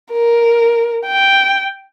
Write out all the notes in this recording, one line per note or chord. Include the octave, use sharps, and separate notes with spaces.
A#4
G5